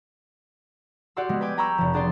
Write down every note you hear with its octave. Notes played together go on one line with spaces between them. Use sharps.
F#4 G4 D5 F#5 C6 E6
G3 G#3 B3
B4 G5 G#5 D6
G5 A#5 B5 C#6 E6
F1 F3
B3 D4 G#4 D5 C6 A6